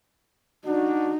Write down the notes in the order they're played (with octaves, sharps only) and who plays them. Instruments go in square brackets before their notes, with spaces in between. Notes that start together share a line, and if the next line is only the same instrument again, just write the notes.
[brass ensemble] D4 F#4 [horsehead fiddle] D#4